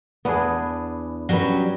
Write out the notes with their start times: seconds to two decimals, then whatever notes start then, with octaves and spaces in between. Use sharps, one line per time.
0.25 E2 B3 D4 G#4
1.29 F#3 G3 C#4 F#4 B4